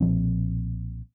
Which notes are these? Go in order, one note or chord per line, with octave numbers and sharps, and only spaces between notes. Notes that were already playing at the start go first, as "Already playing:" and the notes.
B1 A#2 F3 C4